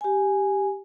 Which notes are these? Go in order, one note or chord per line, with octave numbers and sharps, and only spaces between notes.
G4 G#5